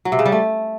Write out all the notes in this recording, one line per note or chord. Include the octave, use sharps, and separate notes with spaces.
F#3
C3
C#3
G3
A3